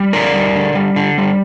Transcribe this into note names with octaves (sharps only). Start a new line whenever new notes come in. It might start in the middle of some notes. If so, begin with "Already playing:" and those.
Already playing: G3
D3 A#4 D5
G3
D3
G3
D3
G3